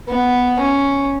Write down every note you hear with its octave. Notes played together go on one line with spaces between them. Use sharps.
B3
C#4